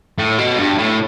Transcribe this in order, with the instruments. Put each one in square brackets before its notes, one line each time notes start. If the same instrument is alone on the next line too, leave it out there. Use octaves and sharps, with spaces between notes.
[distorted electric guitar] A2
B2
G2
A2